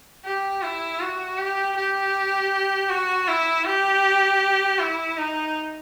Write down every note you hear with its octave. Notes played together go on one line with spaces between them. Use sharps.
G4
E4
F#4
G4
G4
F#4
E4
G4
E4
D#4